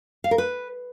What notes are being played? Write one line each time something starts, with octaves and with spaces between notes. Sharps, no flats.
F5
A#4
B4